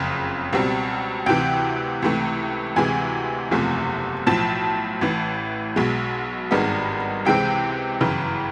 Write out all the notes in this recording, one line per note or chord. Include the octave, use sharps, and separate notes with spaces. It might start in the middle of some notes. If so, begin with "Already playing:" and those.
Already playing: F#1 F2 C#3
C#2 B2 G3 C4
D2 C3 E3 G5
C#2 C3 E3 A3
D2 C3 E3 G#3 G#5
F#1 E2 C3 F3 A3
B1 A2 F3 A5
A1 A2 E3
B1 B2 G#3
G#1 G2 D#3 G#3 B3
C#2 C3 E3 G#3 C4 G5
G1 F#2 C#3 E3